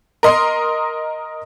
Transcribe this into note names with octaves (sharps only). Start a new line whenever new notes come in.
A#4 D#5 C6